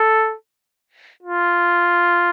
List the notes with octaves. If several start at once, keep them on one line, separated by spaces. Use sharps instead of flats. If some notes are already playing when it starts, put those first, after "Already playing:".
Already playing: A4
F4